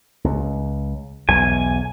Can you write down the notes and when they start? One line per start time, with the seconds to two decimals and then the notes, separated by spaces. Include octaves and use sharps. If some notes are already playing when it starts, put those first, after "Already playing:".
0.24 C#2
1.29 B1 E2 G#5